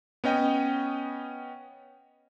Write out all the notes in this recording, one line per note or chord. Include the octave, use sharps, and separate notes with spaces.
B3 C#4 D#5 G5